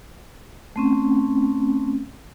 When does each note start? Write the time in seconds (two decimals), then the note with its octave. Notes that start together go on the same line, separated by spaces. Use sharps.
0.76 A3 C4 C#4